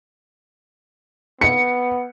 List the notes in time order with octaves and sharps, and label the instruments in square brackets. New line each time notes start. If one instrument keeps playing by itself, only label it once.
[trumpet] B3 [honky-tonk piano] C#7